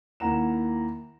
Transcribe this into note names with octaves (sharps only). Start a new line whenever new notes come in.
D#2 A#3 E4 F#5 A#5 E7